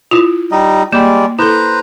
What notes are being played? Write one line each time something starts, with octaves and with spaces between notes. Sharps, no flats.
E4 F4
G3 D#4 D#5
G3 G#3 A#3 D5
E4 A4 B4 C5 A#5